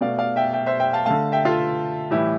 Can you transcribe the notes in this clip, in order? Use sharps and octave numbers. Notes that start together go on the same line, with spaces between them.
B2 A3 D5 F5
D5 F5
E5 G5
E5 G5
C5 E5
E5 G5
F5 A5
D3 A3 F5 A5
E5 G5
F4 A4
A2 E3 G3 E4 G4